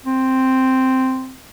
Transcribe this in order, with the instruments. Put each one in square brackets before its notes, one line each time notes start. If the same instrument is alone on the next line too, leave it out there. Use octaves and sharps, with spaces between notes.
[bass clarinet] C4